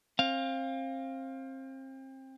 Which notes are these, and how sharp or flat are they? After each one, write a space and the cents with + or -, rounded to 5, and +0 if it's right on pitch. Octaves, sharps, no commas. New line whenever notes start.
C4 +30 F5 +0